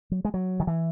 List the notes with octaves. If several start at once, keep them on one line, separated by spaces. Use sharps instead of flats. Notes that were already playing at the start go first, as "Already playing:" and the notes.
F#3
G#3
F#3
D#3
E3